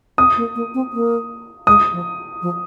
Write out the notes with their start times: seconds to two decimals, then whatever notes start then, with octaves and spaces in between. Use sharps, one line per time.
0.18 C4 D#6
0.37 A#3
0.56 A#3
0.74 C4
0.93 A#3
1.67 G#3 D#6
1.92 F3
2.42 F3